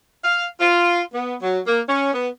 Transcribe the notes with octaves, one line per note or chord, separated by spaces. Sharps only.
F5
F4
B3
F#3
A#3
C#4
B3